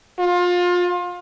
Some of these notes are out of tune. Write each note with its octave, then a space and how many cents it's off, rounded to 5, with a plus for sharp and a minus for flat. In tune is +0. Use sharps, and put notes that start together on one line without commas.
F4 +25